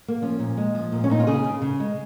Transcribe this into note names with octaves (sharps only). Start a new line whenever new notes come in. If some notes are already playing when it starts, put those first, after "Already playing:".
A#3
F3 C#4
A#2
G#3
F3
A#2
C#4
A#2 D#4
F4
C#3 G#4
C#3
C#3
G#3